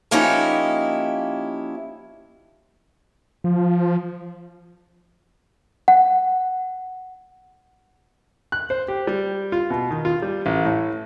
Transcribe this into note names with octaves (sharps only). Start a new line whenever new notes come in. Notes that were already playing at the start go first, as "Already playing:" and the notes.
F3 A#3 C#4 D#4 E4 G4
F3
F#5
F#6
C5
G4
G3
F4
B2
D#3
F4
G3
A1
A2